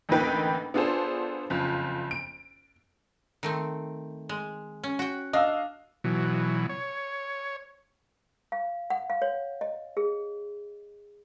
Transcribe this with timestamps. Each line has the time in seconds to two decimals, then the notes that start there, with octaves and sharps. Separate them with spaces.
0.09 A1 D2 A#3 D#4 B4 G5
0.74 B3 D4 F4 G#4 A4 C5
1.50 F#1 F2 F4
2.11 D7
3.43 D#3 A3 C4
4.29 G#3
4.84 C#4
4.99 F#4 G5
5.33 D4 D#5 F5 E6
6.04 B2 E3 F#3
6.69 C#5
8.52 F5
8.90 F#5
9.10 F5
9.22 C#5
9.61 D#5
9.97 G#4